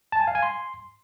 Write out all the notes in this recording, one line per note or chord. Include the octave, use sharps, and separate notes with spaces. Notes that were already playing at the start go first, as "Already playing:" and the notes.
A5
G#5
F5
G#5
C6